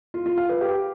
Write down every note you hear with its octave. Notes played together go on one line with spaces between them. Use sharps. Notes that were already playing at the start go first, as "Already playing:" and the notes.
F4
F4
F5
B4
G4